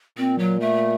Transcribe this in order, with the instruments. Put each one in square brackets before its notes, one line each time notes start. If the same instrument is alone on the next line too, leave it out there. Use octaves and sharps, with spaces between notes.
[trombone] A#2 [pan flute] C4
[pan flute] F#3
A3